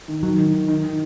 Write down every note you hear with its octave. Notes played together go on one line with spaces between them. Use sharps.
D#3
D#3 F#3
D#3
D#3
D#3
D#3